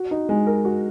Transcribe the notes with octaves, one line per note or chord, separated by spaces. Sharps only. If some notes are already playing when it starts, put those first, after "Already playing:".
Already playing: F#4
D#4
G#3
A#4
F#4